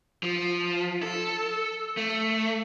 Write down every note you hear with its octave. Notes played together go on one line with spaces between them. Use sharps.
F3
A4
A3